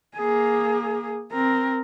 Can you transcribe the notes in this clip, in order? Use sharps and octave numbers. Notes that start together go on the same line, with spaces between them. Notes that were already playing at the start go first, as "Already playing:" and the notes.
A#3 G#4
C4 A#4